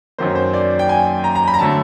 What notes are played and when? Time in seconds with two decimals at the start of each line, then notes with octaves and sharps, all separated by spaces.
0.18 F#2 D#3 F#3 A#3 C5
0.35 C5
0.53 D5
0.79 G5
0.89 G#5
1.24 A#5
1.35 A#5
1.48 B5
1.54 A#5
1.59 D3 F#3 A3 A5